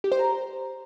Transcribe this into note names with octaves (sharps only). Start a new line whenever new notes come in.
G4
C5
A#5